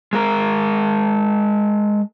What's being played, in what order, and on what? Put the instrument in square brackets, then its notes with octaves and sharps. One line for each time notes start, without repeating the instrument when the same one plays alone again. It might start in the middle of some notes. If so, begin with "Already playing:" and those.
[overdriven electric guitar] G#3 A#4